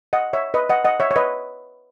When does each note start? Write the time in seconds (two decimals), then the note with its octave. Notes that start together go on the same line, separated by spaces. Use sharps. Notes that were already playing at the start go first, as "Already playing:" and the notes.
0.13 D#5 F#5
0.33 C#5 E5
0.54 B4 D#5
0.70 D#5 F#5
0.84 D#5 F#5
1.00 C#5 E5
1.11 C#5
1.16 B4 D#5